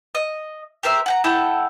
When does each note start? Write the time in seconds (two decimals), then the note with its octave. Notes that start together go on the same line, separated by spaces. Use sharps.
0.15 D#5
0.83 G4 A#4 C5 E5
1.06 F#5 G5 A#5
1.24 E4 A4 F#5 G5